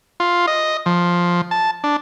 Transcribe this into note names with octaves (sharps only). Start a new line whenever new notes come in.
F4
D#5
F3
A5
D4